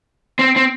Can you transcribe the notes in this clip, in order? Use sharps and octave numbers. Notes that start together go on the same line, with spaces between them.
C4
C4